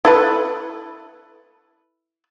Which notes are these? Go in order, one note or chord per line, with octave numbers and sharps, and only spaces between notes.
E4 A4 B4